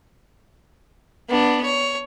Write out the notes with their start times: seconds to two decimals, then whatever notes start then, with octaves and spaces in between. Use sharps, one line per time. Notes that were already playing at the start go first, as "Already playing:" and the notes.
1.29 B3 D4
1.64 C#5